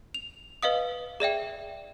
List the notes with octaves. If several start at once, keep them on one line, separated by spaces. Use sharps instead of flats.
F7
B4 D#5 F5 D#6
G#4 D5 E5 G5